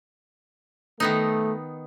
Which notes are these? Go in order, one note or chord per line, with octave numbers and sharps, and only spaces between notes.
D#3 A3 B3 D#4